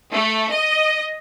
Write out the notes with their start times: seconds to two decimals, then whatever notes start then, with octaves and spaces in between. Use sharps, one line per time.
0.14 A3
0.52 D#5